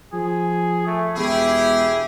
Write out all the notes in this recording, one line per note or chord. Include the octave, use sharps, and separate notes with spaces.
F3 G#4
A3
E1 E4 G4 G#4